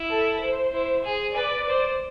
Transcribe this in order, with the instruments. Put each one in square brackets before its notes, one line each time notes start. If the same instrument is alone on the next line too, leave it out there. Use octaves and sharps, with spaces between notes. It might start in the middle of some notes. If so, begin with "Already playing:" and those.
Already playing: [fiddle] E4
[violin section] A4
C5
[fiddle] E4
G#4
[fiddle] B4 [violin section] D5
[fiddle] C5